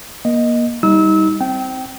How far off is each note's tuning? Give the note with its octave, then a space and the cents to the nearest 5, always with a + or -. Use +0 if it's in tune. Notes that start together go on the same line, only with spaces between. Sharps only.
A#3 +30 D#5 +0
G3 +0 D#4 +30 E6 -30
C4 +0 G5 -20